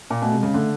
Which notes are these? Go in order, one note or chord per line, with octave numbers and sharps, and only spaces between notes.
A#2
B2 A3
C3
G#3
C#3
D3 A3